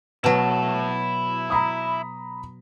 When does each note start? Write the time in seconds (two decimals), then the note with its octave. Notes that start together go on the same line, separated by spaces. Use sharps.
0.24 B2 F#3 E4 A5
1.50 A#5 B5 D#6